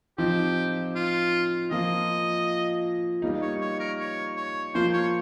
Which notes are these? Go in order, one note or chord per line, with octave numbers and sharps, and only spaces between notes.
F3 C4 D#4 G4
F4
F3 A#3 F4 D#5
G3 A#3 D#4
C#5
C#5
A#4
C#5
C#5
F3 A#3 F4 C5
C#5